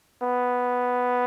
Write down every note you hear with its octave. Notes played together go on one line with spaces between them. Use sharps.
B3